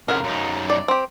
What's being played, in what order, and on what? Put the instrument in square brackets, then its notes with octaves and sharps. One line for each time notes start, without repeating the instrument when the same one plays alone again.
[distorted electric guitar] F2 C#3 [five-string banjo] A#4 F5 F#5
[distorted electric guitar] F#2 D#4
[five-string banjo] D5
C4 G4